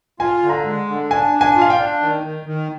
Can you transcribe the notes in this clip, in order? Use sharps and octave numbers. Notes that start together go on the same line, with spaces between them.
F4 G#5
D3
A#5
G#3
D3
D4 G#5
D4
G#5
F4
F5
G5
D4
D#3
D#3
D#3